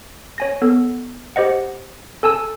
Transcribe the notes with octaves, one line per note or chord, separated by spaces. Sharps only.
C#5 G#5 A#6
B3 A4
G4 C5 D#5 F#5
A4 G#5 A5 E6